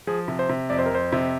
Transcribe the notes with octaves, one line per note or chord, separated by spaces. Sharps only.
F3 G#4
C3
C5
C3
F2 D5
C5
A#4
F2 C5
C3